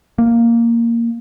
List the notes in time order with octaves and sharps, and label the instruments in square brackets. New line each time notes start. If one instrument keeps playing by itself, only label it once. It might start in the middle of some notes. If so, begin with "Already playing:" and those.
[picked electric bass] A#3